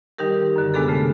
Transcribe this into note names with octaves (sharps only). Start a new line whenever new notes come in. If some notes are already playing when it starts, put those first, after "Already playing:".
D#3 G3 D#4 G4 A#4
F#2 D3
C3 G#3 B3 D4 G#4 A4
C#3 A3